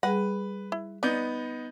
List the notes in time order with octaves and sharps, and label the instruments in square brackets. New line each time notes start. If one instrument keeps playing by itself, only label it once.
[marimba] G3 G#4 [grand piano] B4 [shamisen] F#5
[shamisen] E4
[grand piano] B3 D#4 G6 [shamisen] D5